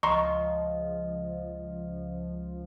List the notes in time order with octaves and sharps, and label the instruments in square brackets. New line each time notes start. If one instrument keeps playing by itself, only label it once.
[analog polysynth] C#2 F3 [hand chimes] D#5 [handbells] A#5 C6 C#6